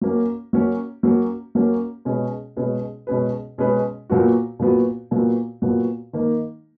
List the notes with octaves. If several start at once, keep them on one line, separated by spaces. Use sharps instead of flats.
F#3 A#3 C#4
F#3 A#3 C#4
F#3 A#3 C#4
F#3 A#3 C#4
B2 G#3 C#4 G#4 B4
B2 G#3 C#4 G#4 B4
B2 G#3 C#4 G#4 B4
B2 G#3 C#4 G#4 B4
A#2 F#3 B3 F#4
A#2 F#3 B3 F#4
A#2 F#3 B3 F#4
A#2 F#3 B3 F#4
D#3 A#3 D#4